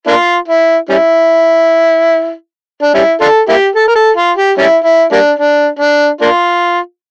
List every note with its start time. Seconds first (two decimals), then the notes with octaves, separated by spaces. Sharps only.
0.07 A#3 D4 F4
0.48 E4
0.90 G3 C#4 E4
2.82 D4
2.94 G3 C#4 E4
3.21 D4 F4 A4
3.49 A#3 E4 G4
3.76 A4
3.88 A#4
3.95 A4
4.17 F4
4.37 G4
4.58 G3 C#4 E4
4.84 E4
5.12 G3 A#3 D4
5.39 D4
5.79 D4
6.21 A#3 D4 F4